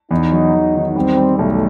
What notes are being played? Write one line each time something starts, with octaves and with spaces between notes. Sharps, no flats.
E2 D#4
F#3
E2
D#3
G3 C4
G3
B1 A3